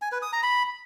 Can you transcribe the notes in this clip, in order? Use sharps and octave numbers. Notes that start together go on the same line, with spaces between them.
G#5
B4
D#6
A#5
B5